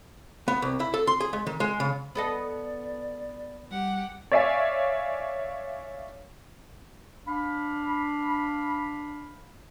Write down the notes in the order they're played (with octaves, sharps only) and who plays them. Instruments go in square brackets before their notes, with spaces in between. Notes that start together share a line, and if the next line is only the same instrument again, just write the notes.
[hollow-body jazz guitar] B3
C2
E4
A4
C6
G#4
G#3
D#3
G#3
C#3
[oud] B3 A4 D#5 [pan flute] D5
[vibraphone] G3 [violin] G4 F#5
[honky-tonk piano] C#5 D5 E5 F5 G#5
[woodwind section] D4 F5 B5